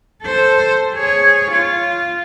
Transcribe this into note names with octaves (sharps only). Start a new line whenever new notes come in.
A4 C5
G#4 C#5
F4